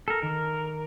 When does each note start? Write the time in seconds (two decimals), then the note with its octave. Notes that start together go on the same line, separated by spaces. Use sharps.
0.08 A4 A#4
0.22 D#3 A#4 D6
0.53 A#5